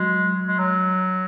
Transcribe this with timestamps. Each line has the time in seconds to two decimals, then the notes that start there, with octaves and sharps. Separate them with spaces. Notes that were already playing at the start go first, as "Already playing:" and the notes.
Already playing: F#3 G#3
0.48 G#3
0.58 F#3